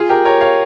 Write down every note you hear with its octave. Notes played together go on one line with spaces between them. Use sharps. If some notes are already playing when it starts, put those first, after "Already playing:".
Already playing: F4 G#4
G4 A#4
A#4 C#5
C#5 F5